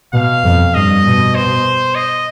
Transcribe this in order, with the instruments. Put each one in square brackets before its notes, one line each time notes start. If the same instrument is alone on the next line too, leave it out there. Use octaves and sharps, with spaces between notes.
[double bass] B2 [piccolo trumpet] F5
[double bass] F2
[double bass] G2 [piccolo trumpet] D#5
[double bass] B2
[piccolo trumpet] C5
D#5